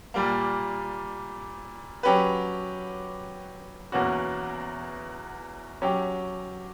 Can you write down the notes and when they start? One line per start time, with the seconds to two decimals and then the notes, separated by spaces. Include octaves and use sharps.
0.14 A#2 G3 A#3
2.03 F#3 C#4 G4 B4
3.92 E2 B2 A#3 C#4 F#4
5.82 F#3 C#4 G4